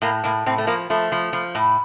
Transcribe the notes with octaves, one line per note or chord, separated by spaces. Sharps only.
A2 A#3
A2 A#3
A2 C4
A3
F3 A#3
F3 A3
F3
F3
A2